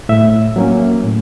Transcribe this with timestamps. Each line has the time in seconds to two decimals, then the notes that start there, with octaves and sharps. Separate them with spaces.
0.09 A2 E5
0.56 F#3 A#3 C#4
1.03 A2